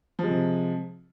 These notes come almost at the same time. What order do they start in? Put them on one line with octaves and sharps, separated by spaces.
F3 G#3 C3